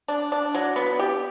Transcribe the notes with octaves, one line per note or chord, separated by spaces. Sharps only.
D4
D4
F#3
B3
G4